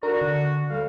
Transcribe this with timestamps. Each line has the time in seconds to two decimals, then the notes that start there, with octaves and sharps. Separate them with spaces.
0.03 D4 F#4 A#4
0.21 D3
0.70 D2 G3 F5